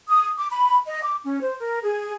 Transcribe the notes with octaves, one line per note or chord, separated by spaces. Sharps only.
D#6
D6
B5
D#5
D6
C#4
C5
A#4
G#4